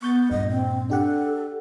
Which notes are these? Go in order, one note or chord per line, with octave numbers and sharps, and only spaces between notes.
B3 C#6 G6 A6
G2 A#2 D#5
C4
D4 G4 A4 F#5